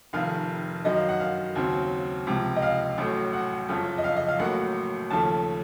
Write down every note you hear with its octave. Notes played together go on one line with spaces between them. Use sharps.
F1 F2 D#3 F5
F#2 D#3 F#3 D#5
F5
F#5
F5
D#2 C#3 F#3 C4
C#2 C3 F3
D#5
F5
A1 A2 F#3
F#5
F#1 F2 C#3 F3
D#5
F5
D#5
F5
A1 A2 F#3 A#3 F#5
D#2 C#3 F3 A3 A5